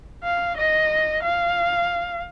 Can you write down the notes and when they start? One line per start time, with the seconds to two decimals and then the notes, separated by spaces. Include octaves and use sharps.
0.23 F5
0.57 D#5
1.23 F5